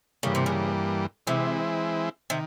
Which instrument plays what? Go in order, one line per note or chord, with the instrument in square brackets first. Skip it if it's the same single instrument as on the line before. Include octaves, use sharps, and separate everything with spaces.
[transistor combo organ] G2 E3 G3 A#3 [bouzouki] C#3
[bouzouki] C3
C#3
[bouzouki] C3 [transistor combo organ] E3 G#3 C4 E4
[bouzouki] C3 [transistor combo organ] D#3